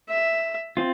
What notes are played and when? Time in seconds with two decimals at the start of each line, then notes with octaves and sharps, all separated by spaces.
0.10 E5
0.77 C4 F4